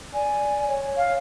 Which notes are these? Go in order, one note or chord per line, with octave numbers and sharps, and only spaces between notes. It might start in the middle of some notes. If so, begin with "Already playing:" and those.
D5 G#5
C#5
F5